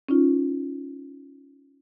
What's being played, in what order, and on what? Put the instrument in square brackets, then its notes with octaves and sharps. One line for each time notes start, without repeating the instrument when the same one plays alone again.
[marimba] C#4 D#4 F4